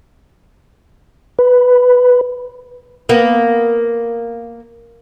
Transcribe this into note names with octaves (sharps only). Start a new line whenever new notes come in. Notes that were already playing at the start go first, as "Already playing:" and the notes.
B4
A#3 B3